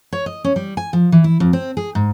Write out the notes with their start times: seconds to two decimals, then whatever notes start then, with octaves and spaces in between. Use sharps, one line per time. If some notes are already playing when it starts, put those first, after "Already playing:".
0.12 C#5
0.26 D#5
0.44 C#4
0.56 G3
0.77 G#5
0.93 F3
1.12 E3
1.24 E4
1.40 F2
1.53 C4
1.77 G#4
1.95 G#2